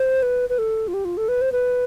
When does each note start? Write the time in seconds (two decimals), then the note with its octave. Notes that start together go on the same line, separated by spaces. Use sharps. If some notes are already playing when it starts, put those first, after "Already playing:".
Already playing: C5
0.22 B4
0.50 B4
0.58 A4
0.88 F4
0.94 G4
1.05 F4
1.17 A4
1.28 B4
1.41 C5
1.52 B4